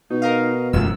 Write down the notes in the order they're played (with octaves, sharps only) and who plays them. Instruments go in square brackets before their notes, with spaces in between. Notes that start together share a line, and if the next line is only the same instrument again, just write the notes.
[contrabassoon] B2 [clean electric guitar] D#4
[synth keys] A#4 D#5 F5
[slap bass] E1 F#2 G#3 [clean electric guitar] A2 F#3 F4 [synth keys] E6